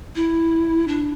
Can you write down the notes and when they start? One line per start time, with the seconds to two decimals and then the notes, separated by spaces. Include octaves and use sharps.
0.15 E4
0.88 D4